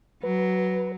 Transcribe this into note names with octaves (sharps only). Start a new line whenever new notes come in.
F#3 B4